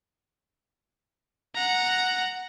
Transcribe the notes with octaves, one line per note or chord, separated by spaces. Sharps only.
F#5 A#5